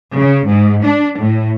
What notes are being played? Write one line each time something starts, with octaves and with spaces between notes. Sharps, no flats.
C#3
G#2
D4
A2